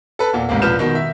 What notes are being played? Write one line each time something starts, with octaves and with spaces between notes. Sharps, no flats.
A4 B4
E2 A#2
A1 G#2 C3 A#3
E1 F3 B4 F6 G6 E7
B2 D#3
E5